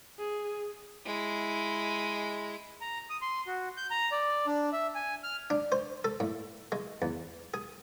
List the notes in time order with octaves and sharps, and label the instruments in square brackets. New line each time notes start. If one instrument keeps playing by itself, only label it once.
[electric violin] G#4
[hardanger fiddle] G#3 E4
[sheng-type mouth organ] A#5
D#6
C6
F#4
G6
A#5
D5
D4
E5
G#5
F6
[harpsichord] D4
C5
A4
A2
G#3
E2
G#4